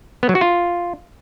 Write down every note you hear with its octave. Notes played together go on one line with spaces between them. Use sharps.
B3
F#3
F#4
F4